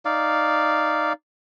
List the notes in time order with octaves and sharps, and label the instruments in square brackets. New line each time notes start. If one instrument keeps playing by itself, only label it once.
[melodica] D#4 D5 F5